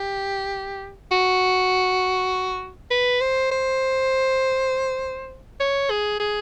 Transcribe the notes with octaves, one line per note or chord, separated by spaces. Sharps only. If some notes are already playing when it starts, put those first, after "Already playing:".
Already playing: G4
F#4
B4
C5
C5
C#5
G#4
G#4